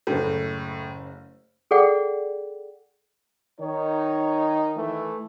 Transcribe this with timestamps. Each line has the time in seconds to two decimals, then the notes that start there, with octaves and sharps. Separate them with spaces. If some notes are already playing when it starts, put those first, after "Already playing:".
0.07 F#1 A2 C#3 A3
1.71 G#4 A4 D5 F#5 G5
3.60 D#3 D#4 C#5
4.76 E3 A3